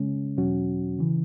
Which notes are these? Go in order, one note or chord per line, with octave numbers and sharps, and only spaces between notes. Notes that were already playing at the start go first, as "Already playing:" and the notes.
Already playing: C#3 G#3 C#4
E2 B2 F#3 C#4 F#4
C#3 E3